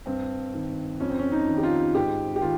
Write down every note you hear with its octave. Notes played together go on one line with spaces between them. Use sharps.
G2 C4
D#3
F2 C#4
C4
C#4
D#4
D#3
G4
F4
G#2 G4
G4
D#3 F4